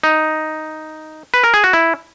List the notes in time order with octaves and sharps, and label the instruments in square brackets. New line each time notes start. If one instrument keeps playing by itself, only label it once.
[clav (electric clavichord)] D#4
B4
A#4
G#4
F#4
E4